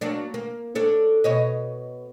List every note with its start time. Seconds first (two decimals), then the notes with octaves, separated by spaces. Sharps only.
0.01 F#3 A#3 D4
0.34 A#3
0.75 D4 A4 C#5
1.24 B2 C#5 D#5